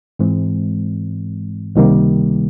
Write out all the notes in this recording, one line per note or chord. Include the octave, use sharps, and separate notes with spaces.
G#2 E3 G#3 C4
C#2 C3 D#3 G3 A#3